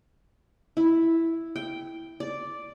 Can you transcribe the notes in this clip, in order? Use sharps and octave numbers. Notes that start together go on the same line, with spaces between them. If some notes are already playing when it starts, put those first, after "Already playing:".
E4
G5
D5